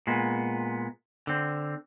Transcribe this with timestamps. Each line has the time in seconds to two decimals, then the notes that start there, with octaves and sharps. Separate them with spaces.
0.07 A#2 G#3 B3
1.27 D3 C4